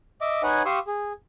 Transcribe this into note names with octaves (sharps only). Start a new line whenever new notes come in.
D#5 E5 D6
D#4 B4 C#5 F#5 G#5
G4 F5 C6 C#6 D#6 E6
G#4